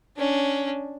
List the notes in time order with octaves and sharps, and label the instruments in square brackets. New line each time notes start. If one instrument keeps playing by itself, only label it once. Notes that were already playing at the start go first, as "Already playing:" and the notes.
[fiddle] C#4 D4